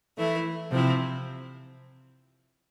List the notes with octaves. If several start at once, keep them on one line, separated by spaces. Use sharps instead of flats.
E3 A3 E4
C3 F3 C4 E4